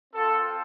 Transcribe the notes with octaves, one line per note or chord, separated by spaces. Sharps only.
C4 F4 A4